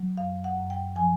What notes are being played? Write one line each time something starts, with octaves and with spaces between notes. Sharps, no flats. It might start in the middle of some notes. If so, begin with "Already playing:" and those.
Already playing: F#3
F#2 F5
F#5
F#2
G5
F3 G#5